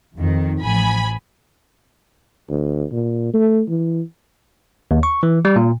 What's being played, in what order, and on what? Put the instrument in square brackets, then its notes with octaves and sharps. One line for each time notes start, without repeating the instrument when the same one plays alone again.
[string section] F2 D#3
A1 F3 G#5 B5
[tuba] D2
A#2
A3
E3
[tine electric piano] D#2
C#6
E3
G3
A#2